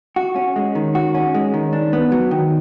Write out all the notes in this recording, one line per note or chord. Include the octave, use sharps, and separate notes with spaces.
F#4
C#4
G#3
D#3
F#4
C#4
G#3
D#3
D4
B3
F#3
D#3